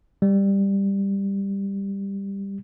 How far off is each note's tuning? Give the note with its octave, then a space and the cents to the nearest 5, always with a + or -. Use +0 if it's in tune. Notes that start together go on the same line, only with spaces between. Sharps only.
G3 +10